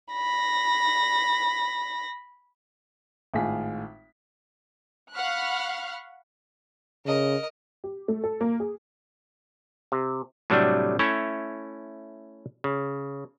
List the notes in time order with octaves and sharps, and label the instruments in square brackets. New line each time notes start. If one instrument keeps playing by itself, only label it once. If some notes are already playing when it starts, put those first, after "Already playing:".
[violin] B5 A#6
[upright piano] G#1 A2 F4 G#4 B6
[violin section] F5 F#5 B5 C#6 F6 F#6
[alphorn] C#3 [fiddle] A#4 D#5
[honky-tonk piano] G4
A3
A4
A#3
G#4
[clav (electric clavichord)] C3
A2 C3 F#3 G3 A3 D4
A3 C#4 E4 C#5
C#3